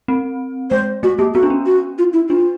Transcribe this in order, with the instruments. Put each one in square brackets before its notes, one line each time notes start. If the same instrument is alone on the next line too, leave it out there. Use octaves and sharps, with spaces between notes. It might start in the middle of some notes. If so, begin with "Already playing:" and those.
[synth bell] C4
[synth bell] G#3 [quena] C5
[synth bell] A3 [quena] F#4
[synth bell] A#3 [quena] G4
[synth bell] B3 [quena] F#4
[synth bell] D4
C#4
[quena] F#4
F4
E4
[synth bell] D4 [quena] F4